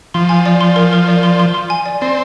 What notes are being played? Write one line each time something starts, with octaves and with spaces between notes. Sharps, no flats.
F3 C6
G#5
D5
C6
A#4
A#4
D5
C6
C6
C6
G#5
D5
C4 D5